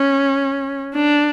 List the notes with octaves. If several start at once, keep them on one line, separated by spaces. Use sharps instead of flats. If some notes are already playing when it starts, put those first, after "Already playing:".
Already playing: C#4
D4